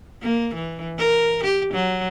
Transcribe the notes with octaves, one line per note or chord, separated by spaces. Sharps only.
A#3
E3
A#4
G4
F#3